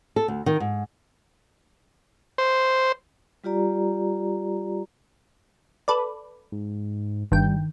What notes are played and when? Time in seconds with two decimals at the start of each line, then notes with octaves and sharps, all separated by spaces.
0.16 A4
0.28 D2
0.46 D#3
0.60 G#2
2.38 C5
3.44 G3 F4 G4 D5 A#5
5.88 A4 B4 D5
6.52 G#2
7.32 G1 D#3 G3 G5